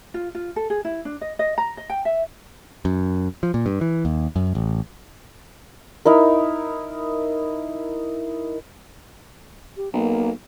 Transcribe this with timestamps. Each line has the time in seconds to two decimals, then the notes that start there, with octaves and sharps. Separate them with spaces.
0.14 F4
0.35 F4
0.56 A4
0.70 G#4
0.85 E4
1.05 D4
1.21 D#5
1.39 D#5
1.58 A#5
1.77 D#5
1.90 G5
2.05 E5
2.85 F#2
3.43 F3
3.54 A#2
3.66 G2
3.81 E3
4.05 D#2
4.36 F#2
4.55 A1
6.05 D#4 E4 A#4
9.77 G4
9.94 B1 A#3